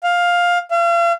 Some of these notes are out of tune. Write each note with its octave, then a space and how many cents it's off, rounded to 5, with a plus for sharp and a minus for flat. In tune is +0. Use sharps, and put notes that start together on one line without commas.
F5 +10
F5 -40